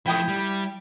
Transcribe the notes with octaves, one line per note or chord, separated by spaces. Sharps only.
F3 A3 E4 G5 D#6
G3